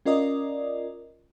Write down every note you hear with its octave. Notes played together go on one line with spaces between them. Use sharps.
C#4 F4 A#4 D5 D#5